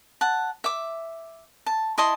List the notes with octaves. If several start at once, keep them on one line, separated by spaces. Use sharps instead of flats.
F#5 A5
E5 D6
A5
E4 D#5 A5 C6